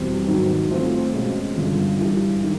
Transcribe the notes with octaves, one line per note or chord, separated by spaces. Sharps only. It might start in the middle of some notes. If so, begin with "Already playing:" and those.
Already playing: E2 B2 G3 C4
G#2 D#3 F#3
F3 A3 C4 F4
B2 G#3 C#4 F#4
G2 D3 F3
G2 E3 G3
D#3 G#3